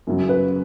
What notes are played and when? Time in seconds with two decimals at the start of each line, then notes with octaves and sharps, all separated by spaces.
0.07 F#2 C#3 F#3
0.29 B4